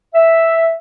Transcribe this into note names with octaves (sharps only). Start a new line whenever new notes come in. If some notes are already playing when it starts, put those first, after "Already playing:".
E5